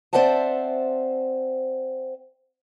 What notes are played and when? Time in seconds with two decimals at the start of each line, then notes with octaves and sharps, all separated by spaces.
0.13 C4 C5 D5 E5 F#5 A5